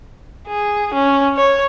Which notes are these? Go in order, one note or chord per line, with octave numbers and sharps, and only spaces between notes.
G#4
C#4
C#5